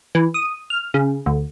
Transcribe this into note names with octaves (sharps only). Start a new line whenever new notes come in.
E3
D#6
F6
C#3
D2